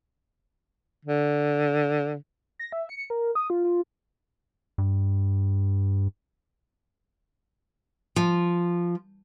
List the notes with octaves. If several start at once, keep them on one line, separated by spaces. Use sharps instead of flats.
D3
A#6
E5
C#7
A#4
D#6
F4
F4
G2
F3